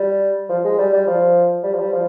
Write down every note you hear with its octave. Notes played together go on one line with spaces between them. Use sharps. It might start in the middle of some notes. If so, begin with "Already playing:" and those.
Already playing: G3
F3
G#3
G3
G3
F3
G3
F3
G3
F3